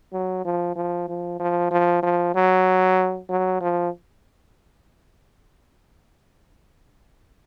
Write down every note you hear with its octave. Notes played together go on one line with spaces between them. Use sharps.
F#3
F3
F3
F3
F3
F3
F3
F#3
F#3
F3